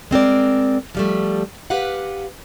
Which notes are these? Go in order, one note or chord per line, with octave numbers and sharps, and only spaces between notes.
G#3 C4 A#4 D5
F3 G3 A3
G4 B4 F5 F#5